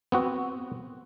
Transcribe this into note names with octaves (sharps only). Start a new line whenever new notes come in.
B3 C4 F#4